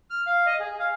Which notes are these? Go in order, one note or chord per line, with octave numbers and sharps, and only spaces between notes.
F6
F5
D#5
G#4
F5